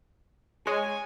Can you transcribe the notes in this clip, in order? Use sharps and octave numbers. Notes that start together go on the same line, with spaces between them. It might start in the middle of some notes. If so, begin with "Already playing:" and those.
G#3 C#5 G#5